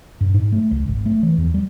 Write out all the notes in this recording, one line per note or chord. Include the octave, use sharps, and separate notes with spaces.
G2
G#2
A3
C#2
G#1
A3
E3
E2
G3